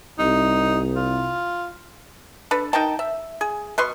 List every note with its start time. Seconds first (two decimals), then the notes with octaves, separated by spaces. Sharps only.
0.19 C2 D#4
0.96 F4
2.51 D4 A4 B4
2.73 D#4 A#4 G5 A5
2.99 E5
3.41 G#4
3.78 B2 B4 C6 C#6